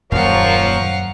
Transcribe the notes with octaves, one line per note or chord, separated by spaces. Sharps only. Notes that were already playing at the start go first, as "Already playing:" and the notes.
D#1 F#2 A#2 F3 A#4 C#5 F5 F#5